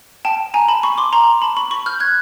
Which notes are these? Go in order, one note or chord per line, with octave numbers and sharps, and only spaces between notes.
G5 A5
G#5 A#5
A5 B5
B5 C#6
C6 D6
A#5 C6
A5 B5
B5 C#6
B5 C#6
F6 G6
F#6 G#6